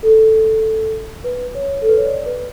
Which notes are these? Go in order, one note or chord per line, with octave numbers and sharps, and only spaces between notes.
A4
B4
C#5
A4
B4
C#5
D5
B4